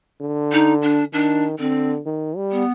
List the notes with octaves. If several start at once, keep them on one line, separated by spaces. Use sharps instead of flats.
D3
D#4
D4
D#3 D4
D3 C4
D#3
G3
B3